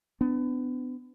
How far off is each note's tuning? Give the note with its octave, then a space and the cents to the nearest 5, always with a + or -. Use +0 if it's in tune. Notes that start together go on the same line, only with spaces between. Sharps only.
B3 +30 D4 +5